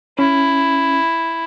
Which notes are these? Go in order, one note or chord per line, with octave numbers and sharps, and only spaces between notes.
C#4 E4